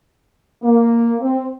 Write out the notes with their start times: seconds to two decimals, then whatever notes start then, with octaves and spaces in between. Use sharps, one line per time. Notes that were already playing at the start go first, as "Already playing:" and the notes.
0.63 A#3
1.20 C4